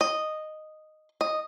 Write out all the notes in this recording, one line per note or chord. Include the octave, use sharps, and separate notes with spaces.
D#5
D#5